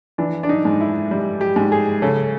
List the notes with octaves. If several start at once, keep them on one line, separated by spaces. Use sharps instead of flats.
E3 D4
D4
D#4
G#2
E4
G3
G4
G#2
G#4
C#3 A4